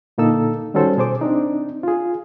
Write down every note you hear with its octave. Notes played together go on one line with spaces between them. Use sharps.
A#2 D3 A#3 D#4 A4 E6
D#3 G3 C#4 F#4 A4 C5
B2 G#4 C5 D6
C4 D4 D#4
F4 G#4